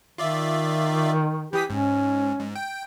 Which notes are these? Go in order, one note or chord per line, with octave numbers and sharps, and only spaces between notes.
D#3 F4 D5 E5
E3 G4 D#6 B6
G#2 C#4
G#2
G5